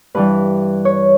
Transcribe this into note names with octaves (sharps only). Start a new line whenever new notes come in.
G2 E3 G3 B4
C#5